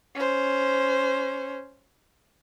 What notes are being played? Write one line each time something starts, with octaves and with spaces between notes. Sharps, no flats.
C#4 C5